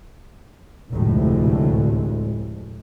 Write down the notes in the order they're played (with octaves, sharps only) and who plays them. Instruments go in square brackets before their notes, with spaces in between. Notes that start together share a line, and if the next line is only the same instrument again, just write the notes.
[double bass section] F1 D2 A2 G#3